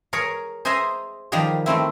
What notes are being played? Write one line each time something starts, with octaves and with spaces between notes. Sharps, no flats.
G#4 A#4 C#5
G#4 C5 D#5 E5 G#5 A#5
D#3 F3 G3 G4 G#4
D#3 A3 C4 E4